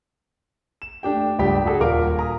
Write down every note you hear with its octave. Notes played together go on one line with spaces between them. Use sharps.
E7
A3 D4 G4 G5
C#2 G2 G4 D5 B6
F#4 G#4 A4 D5
D#1 A#4 F5 D6 D7
G#5 A#5 D#6